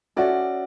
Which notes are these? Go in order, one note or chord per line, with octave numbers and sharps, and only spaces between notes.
C#4 F#4 A4 D5 E5